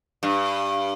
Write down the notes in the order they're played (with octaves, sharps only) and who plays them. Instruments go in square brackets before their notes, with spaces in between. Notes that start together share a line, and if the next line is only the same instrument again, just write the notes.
[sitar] G2